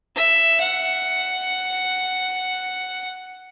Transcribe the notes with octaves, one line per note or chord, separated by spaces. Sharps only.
E5
F#5